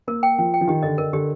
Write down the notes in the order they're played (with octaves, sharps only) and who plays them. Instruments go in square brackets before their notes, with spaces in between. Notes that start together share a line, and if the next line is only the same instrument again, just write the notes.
[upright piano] A#3 [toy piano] A#4
[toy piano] G5
[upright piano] F3 [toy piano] G5
[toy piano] G5
[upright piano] F3
[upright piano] D#3 [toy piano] G4
[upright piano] D3 [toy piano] D#5
[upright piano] D3 [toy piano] A#4
[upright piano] D3 [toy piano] G4